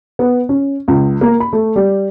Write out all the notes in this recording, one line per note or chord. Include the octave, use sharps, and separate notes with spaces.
B3
C#4
C#2
A#3
B5
A3
G3